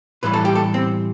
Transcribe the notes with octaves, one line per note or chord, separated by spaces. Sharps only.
A2 E3 G3 B4
A4
G4
A4
C4